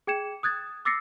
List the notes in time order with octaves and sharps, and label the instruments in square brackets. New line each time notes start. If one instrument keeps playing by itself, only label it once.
[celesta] G#4 G5 G#6 C#7 E7
D#6 F#6 G#6 A6
D6 E6 A6 A#6 C7 C#7